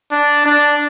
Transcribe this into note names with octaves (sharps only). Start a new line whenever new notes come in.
D4
D4